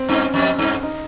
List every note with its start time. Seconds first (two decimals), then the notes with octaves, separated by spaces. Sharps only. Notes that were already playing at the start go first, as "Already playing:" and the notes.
Already playing: C4
0.09 G2 C#4
0.34 F2 C#4
0.59 G2
0.83 D#4